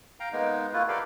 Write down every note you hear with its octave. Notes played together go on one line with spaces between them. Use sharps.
F5 G5 A#5
G#3 A#3 B3 D#4
A3 A#3 E4 F4 B4
E4 G4 A4 A#4 D5 F5